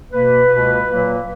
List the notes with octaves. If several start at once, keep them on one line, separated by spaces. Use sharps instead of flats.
B2 A#3 B4
C#2 B2 A#3
A#2 F#3 A#3